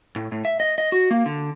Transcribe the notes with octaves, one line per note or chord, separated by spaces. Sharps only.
A2
A2
E5
D#5
D#5
F#4
A#3
D3